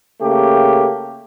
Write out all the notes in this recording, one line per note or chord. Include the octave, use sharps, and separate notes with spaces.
C#3 A3 A#3 G4